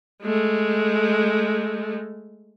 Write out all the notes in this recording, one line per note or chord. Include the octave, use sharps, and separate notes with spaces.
G#3 A3